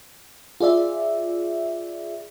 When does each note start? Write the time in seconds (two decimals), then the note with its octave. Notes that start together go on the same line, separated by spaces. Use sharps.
0.60 F4 G#4 D5 E5